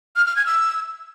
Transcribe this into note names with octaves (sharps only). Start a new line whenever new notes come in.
F6
F6
G#6
E6